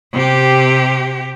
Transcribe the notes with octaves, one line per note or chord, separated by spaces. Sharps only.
C3 G4